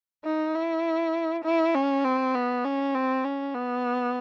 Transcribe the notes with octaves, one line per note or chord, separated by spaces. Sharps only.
D#4
E4
E4
C#4
C4
B3
C#4
C4
C#4
B3